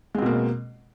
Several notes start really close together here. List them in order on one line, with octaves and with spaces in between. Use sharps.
G#3 C4 B2 A#3